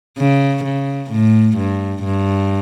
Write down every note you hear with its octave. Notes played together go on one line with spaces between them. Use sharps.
C#3
C#3
A2
G2
G2